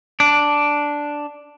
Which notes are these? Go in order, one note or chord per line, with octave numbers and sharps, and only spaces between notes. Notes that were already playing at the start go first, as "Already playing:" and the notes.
D4